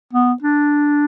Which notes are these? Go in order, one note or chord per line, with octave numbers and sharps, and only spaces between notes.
B3
D4